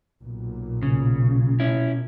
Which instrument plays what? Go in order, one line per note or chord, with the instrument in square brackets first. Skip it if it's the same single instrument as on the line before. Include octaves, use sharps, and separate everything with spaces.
[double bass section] B1 A#2
[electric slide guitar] C#3
C#4 E4